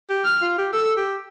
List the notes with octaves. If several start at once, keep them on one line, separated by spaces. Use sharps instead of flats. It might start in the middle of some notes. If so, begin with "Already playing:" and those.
G4
F6
F4
G4
A4 E6
G4